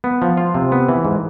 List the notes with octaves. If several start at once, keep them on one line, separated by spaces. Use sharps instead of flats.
B3
F3
F4
C3
B3
E3
G#2